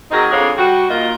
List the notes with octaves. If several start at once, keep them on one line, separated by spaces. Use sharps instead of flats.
F#3 C4 D#4 G#4 A#4
F2 D4 G#4 C#5 F5
G3 F#4
A#2 D#3 F4 A#4 D#5